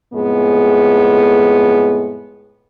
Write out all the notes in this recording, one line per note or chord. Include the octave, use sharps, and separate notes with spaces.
F2 A2 G#3 B3 G#4